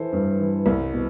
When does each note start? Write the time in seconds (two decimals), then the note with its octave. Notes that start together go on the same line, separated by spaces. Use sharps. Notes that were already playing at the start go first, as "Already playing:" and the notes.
Already playing: E3 A4 C5
0.12 G2
0.39 E3
0.66 C2
0.93 B2